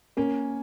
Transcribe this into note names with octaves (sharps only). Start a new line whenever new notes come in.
A#3 C#4